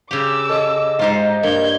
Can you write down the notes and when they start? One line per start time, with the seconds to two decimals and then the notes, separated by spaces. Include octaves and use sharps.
0.11 C#3 G4 D6 E6
0.49 A4 C#5 D#5 E5
0.99 G#2 D#4 F4 G4 C5
1.43 G2 A#3 G6 G#6